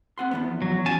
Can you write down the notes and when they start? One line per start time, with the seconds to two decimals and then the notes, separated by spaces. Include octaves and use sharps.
0.18 C4 F#5 C6
0.31 E2 F3 B3
0.62 F#3
0.86 C#4 G#5 A5